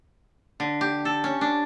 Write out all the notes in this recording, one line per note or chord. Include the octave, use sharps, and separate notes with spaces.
D3
G4
A4
C#4
D4